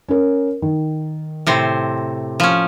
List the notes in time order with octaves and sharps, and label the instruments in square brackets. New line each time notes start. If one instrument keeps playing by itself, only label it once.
[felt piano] C#4 A#4
D#3
[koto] A2 C3 C5
F3 C#4